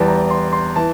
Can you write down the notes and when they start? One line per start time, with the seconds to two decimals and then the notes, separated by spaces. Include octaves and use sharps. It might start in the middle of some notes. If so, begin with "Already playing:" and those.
Already playing: E2 E3 G3 A5
0.08 A#5
0.30 C6
0.53 C6
0.76 E3 A5